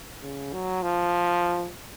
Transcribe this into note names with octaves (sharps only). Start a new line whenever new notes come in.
C#3
F#3
F3